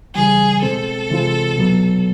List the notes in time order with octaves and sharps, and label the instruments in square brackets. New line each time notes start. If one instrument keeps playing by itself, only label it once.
[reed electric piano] C#3 E3 G3 [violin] G#4
[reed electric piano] B2 G#3 C4 [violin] A4
[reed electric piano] C3 E3 G#3 C4 F4
C2 B2 F#3 B3